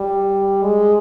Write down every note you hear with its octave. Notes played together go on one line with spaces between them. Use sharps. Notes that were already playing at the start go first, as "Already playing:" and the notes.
Already playing: G3
G#3